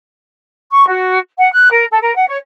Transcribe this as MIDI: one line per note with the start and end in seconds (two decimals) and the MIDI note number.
0.71 0.85 85
0.87 1.19 66
1.38 1.49 78
1.53 1.68 90
1.72 1.85 70
1.91 1.98 69
2.02 2.13 70
2.15 2.28 78
2.28 2.38 73